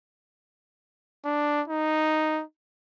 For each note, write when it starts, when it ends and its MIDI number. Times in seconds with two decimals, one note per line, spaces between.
1.25 1.62 62
1.68 2.42 63